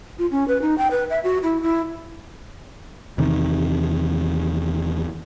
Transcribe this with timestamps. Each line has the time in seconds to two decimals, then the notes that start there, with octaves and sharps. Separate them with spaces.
0.19 F4
0.31 C#4
0.48 B4
0.62 D#4
0.78 G5
0.91 B4
1.10 E5
1.24 F#4
1.43 E4
1.62 E4
3.18 E2 C3 D#3